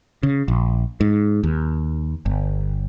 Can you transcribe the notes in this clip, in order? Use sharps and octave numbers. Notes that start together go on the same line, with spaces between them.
C#3
A#1
G#2
D#2
G1